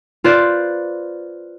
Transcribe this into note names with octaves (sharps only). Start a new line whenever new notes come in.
F4 B4 C5 D5